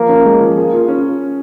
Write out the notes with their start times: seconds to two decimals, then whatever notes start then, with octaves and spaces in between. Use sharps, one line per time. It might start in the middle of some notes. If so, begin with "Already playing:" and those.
Already playing: F3 A#3
0.09 C#4
0.26 G#3
0.40 F3
0.57 A#3 G#4
0.73 F4
0.88 C#4